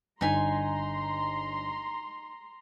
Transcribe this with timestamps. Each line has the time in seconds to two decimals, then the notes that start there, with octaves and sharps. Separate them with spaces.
0.21 G1 D3 D#4 G#5 A#5 C6 B6